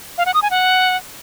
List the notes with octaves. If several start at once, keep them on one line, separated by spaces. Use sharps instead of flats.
F5
F#5
D#6
G#5
F#5